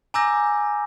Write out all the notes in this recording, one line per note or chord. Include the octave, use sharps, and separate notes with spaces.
G#5 A#5 D6 E6 G6 A#6